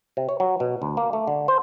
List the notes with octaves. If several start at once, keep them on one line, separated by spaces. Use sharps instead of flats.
C3
C#5
F#3
B2
D2
A#3
A3
D3
C5